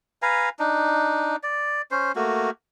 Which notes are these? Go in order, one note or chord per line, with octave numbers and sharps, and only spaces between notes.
B4 F5 G#5 A#5
D4 D#4
D5
C#4 C5
A3 A#3 F#4